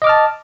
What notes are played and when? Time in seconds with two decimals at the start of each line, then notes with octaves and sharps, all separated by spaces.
0.02 D#5
0.04 D6
0.07 F6
0.09 A5